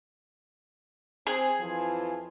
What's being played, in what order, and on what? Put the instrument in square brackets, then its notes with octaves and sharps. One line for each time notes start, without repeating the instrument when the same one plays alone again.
[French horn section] C4 [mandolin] G#4
[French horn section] F2 E3 F3